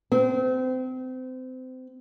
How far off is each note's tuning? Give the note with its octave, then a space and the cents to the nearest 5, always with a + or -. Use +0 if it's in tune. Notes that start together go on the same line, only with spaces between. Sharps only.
C4 -30